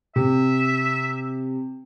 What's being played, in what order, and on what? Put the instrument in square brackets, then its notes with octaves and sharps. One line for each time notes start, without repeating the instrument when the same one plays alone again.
[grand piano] C3 [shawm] E5